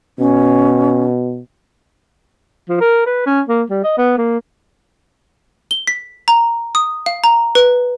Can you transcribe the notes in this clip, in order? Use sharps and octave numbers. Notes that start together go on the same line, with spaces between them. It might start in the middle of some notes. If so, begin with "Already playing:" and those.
B2 C#4
F3
A#4
B4
C#4
A#3
G3
D#5
B3
A#3
G7
B6
A#5
D#6
F5
A#5
B4